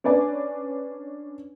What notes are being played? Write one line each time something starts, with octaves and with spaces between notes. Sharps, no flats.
C#4 D4 B4 D5 G#5